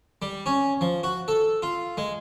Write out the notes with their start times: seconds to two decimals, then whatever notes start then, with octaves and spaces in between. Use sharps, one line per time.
0.22 G3
0.46 C#4
0.81 F3
1.03 F#4
1.28 A4
1.62 F4
1.97 G#3